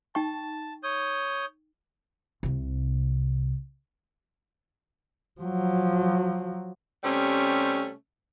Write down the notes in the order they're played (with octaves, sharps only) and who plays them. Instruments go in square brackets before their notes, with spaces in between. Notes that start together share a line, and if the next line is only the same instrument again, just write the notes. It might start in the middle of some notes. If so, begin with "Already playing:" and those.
[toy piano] D#4 G5 C#6 [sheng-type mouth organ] A5
[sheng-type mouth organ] C#5 D#6 G6
[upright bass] C2 C3
[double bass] F3 F#3
[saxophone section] C3 G3 A3 C#4